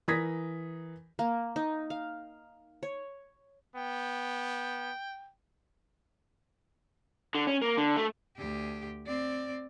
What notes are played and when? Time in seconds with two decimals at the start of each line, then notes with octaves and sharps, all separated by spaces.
0.08 E3 A#4 D#6 G#6 A#6 B6
1.19 A#3
1.56 D#4
1.90 F5
2.83 C#5
3.76 B3 G5
7.35 D3
7.47 C#4
7.62 A#3
7.78 D3
7.97 A3
8.37 D2 G4
9.06 C4 D5